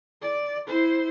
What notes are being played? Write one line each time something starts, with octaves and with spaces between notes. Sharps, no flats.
D5
E4 C5